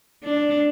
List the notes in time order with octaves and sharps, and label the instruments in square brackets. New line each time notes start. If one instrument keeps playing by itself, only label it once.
[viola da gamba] D4